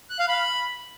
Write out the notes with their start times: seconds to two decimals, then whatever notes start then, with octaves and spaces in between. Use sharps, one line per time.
0.10 F#6
0.19 F5
0.29 B5